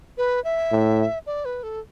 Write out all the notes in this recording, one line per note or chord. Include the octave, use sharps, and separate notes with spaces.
B4
E5
A2
D5
B4
A4